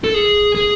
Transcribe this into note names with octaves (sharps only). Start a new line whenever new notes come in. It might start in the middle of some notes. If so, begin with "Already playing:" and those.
A4
G#4
G#4